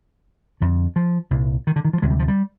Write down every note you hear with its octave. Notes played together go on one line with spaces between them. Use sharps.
F2 D3
F3
C2 A#2
D#3
D3
D#3
F3
D2 C3 G#3
G3
F3
G3